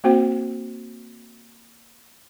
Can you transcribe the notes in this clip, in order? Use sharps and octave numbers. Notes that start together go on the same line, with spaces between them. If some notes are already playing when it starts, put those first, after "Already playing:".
A#3 C4 F#4 C5 G5